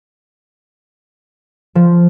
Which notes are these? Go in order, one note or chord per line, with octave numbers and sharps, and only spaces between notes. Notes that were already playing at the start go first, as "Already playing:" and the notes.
F3